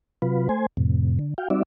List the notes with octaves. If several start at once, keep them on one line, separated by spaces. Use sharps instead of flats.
C3 F#3 F4 B4
A3 C5 G#5
F2 A2 C3
D3
F#4 F5 G5
G3 C4 D#4 F#4 D5 E5